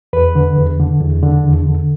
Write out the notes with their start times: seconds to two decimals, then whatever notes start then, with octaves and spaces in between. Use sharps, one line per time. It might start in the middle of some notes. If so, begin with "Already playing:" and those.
0.13 E2 B4
0.35 D3
0.57 E2
0.80 D3
1.01 E2
1.23 D3
1.44 E2
1.67 D3